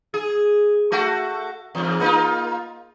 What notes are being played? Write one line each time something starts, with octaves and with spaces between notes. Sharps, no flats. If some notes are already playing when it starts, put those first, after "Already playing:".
G#4
A3 F#4
E2 G#2
A#3 D#4 F4